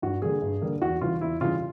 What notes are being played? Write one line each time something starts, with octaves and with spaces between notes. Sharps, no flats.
G2 F#4
D3 G3 A#3 G#4
G2
D3 G3 A#3
E2 F#4
C#3 E3 G3 F4
E2 E4
C#3 E3 G3 F4